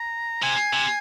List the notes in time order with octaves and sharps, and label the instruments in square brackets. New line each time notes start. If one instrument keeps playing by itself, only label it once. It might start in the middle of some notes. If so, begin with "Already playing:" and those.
Already playing: [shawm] A#5
[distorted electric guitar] C3 [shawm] G#5
[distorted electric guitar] C3